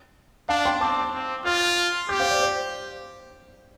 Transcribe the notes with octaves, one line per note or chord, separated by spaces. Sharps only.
D4 F5 A5
G5 C6
C4 A5 D6
C4
F4 F6 A6
G4 D6 G6
C5 F5
D5
C5